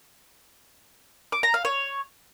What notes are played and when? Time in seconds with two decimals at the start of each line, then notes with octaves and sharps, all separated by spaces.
1.32 D6
1.43 A#5
1.54 F5
1.65 C#5